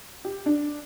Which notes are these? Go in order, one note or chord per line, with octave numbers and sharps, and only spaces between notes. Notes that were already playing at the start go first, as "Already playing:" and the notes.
G4
D4